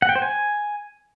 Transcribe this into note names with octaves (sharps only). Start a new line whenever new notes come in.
F#5
G5
C5
G#5